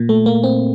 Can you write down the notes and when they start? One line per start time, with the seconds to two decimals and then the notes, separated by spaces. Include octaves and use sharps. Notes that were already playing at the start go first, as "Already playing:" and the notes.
Already playing: A#2
0.09 A3
0.26 A#3
0.44 C4